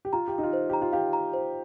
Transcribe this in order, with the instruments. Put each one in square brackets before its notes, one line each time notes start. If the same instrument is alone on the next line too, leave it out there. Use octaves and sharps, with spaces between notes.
[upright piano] G4
[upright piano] F4 [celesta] A#5
[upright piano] G4 [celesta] F5
[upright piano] D#4
F4
[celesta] C5
[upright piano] G4 [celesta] A#5
[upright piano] F4
[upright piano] G4 [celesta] F5
[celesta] A#5
C5